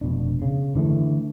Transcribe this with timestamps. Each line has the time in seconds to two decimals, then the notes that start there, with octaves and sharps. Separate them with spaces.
0.01 F1 B2 D4
0.42 C#3
0.75 D3 E3 G#3 A3